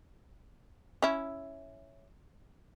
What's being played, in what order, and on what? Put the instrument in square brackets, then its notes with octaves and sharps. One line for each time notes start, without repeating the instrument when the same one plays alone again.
[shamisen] C#4 E4